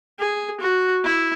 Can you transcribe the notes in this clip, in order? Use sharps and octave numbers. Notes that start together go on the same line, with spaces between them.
G#4
F#4
E4